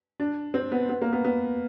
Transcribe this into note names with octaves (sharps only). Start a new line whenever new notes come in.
D4
C4
B3
B3
A#3
B3
B3